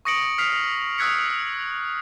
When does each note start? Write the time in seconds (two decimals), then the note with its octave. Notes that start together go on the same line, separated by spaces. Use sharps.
0.05 C#6 D#6 A#6 C#7 D7 F#7
0.38 D#6 F6 B6 C7 F7
0.98 D#6 E6 F#6 G#6 B6 C#7